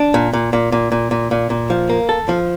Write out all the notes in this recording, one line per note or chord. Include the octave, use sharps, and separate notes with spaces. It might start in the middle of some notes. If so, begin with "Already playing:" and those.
Already playing: D4
A#2
A#2
A#2
A#2
A#2
A#2
A#2
A#2
F3
A#3
A4
F3